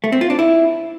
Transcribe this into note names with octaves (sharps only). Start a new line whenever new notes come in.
A3
C4
F4
D4
E4